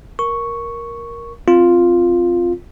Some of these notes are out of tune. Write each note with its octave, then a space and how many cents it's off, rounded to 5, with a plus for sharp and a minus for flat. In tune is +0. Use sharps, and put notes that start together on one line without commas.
A#4 +5 C#6 +0
C4 +0 F4 +0